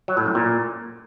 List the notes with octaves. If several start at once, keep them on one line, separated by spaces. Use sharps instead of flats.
F#3
A2
F#2
A#2